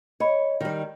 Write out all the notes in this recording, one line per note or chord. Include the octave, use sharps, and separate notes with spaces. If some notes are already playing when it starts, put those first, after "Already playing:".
C#5 D#5 B5
D#3 G3